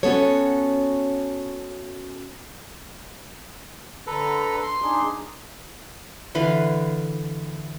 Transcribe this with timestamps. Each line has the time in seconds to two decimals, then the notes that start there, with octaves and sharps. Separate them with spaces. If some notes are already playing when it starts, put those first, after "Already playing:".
0.03 B3 C#4 F#4 A4 C#5
4.07 D3 A4 B4 A#5
4.63 C6
4.82 D4 D#4 G#4
6.35 D3 E3 B4 F5